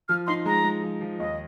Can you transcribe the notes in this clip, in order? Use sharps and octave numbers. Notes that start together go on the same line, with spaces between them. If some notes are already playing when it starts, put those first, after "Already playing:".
F3 F6
D#4 C6
G#3 A#5
G#3
F3
F3
D#2 D#5